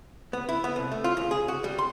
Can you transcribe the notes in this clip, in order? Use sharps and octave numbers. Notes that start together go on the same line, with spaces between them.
B3
E4
B3
C2
A3
F4
C#2
G#4
F#4
G3
C6